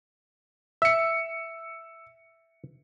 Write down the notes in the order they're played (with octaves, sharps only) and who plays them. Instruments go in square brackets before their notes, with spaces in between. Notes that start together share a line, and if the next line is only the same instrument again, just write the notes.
[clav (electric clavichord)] E5 [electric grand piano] E6 C#7